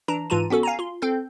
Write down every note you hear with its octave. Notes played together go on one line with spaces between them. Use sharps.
E3 D4 A#5
G#2 E3 F4 A5 A#5 D#7
B3 C#4 F#4 A4
F5 G#5 A#5
F4 C6
C4 A4 G6